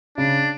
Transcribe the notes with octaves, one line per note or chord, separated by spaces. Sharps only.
C#3 D4